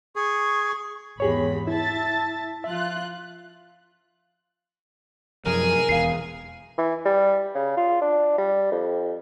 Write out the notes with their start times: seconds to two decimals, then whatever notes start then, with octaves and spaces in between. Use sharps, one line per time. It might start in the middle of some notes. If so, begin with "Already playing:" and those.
0.16 G#4 C#6
1.20 G#1 E2 G4 G#4 C#5 B5
1.67 E4 E5 A5 A6
2.64 F3 F4 E5 F#6
5.46 F#2 C3 F3 G#4 A#4 G#5
5.89 E1 E2 F5 C7
6.78 E3
7.05 G3
7.55 C#3
7.77 F4
8.02 D4
8.38 G3
8.72 F2